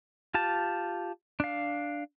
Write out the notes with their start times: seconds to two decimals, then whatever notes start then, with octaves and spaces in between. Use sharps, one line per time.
0.34 F4 G4 A5
1.40 D4 F5